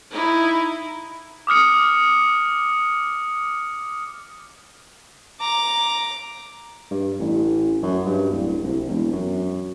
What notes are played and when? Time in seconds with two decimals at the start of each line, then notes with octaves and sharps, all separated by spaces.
0.11 D#4 E4
1.47 D6 D#6 F6 C#7
5.41 A#5 D6
6.91 G2
7.20 A1
7.83 F#2
8.06 G2
8.31 D1
8.64 C2
8.88 E1
9.12 F#2